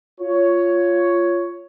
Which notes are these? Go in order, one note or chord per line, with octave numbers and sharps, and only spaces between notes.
F4 C#5